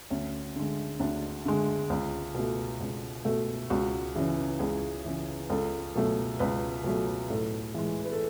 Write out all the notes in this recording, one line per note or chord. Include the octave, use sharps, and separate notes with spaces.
D2 C#4
D3 G#3
D2 D4
D3 G#3
C#2
B2 A3
C#2
B2 A3
C#2 F#4
C#3 E3
C#2 G#4
C#3 E3
C#2 A4
B2 F#3 A3
C#2 B4
B2 F#3 A3
A2 A4
E3 G#3
B4
A4